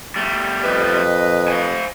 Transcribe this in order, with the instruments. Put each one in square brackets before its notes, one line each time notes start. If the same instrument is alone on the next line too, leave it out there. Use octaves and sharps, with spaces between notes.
[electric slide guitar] G3 A3
[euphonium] F2 [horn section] B4 D#5
[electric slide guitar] C5 F5 G#5